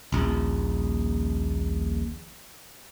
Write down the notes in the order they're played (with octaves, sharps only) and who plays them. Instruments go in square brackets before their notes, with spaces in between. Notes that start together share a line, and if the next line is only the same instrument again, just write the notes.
[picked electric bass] D#1 A#1